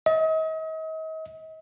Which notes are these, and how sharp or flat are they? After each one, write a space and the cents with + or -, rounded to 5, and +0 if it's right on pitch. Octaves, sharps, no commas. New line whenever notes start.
D#5 +40